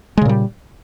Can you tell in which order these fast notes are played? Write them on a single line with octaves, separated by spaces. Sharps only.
G#3 C#3 A#2 G3